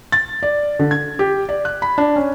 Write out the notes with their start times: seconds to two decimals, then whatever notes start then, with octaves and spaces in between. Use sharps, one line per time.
0.12 A6
0.43 D5
0.79 D3
0.91 G#6
1.19 G4
1.49 D5
1.65 F#6
1.82 B5
1.98 D4
2.16 C#4